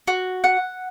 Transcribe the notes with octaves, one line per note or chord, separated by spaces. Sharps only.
F#4
F#5